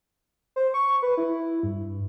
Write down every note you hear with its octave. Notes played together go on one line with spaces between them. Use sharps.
C5
C#6
B4
E4
G2